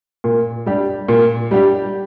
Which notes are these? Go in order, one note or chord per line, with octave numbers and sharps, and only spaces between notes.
A#2
G3 D4 G4
A#2
G3 D4 G4